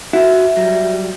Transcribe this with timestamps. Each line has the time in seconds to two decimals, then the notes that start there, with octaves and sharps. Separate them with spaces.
0.13 E4 F#4 E5
0.57 F#3 G3